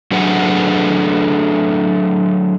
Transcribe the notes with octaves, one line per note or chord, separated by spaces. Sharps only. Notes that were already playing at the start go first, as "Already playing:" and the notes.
F#3 A3 D4 G#4 B4 F#5